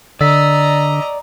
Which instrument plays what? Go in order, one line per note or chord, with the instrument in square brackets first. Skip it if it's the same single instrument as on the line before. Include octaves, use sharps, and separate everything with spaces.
[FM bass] D3 [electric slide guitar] D5 [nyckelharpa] D#5 A#5 [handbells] E6 B6